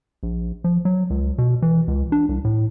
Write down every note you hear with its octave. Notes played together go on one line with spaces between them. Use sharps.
A#1
F3
F#3
C#2
B2
E3
C#2
D4
C2
A2